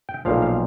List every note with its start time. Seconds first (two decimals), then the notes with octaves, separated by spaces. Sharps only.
0.09 G5
0.25 B1 A#2 F3 F5
0.42 F5